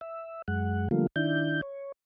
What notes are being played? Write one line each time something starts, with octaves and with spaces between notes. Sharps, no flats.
E5
F#2 G#3 F#5
D3 F3 G3 A3 A#3 F4
D#3 D4 E4 G6
C#5